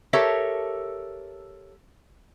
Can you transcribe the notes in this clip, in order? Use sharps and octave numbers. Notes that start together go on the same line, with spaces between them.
G4 A4 A#4 C#5 E5 A5